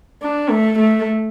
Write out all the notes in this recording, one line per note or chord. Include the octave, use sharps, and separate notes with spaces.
D4
A3
A3